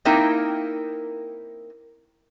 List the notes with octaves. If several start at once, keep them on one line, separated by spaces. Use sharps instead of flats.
A#3 C4 D#4 E4 A#4 G5